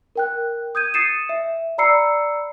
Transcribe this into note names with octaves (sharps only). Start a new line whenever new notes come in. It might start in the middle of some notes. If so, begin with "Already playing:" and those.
A#4 G5 F#6
D#6 G6 G#6 D#7
D#6 A6 C7 C#7 D#7 E7
E5
D5 A#5 B5 E6 C7 C#7